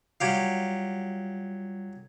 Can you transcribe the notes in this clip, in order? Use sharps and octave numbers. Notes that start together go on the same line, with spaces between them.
F#3 G3 F4 G4 F5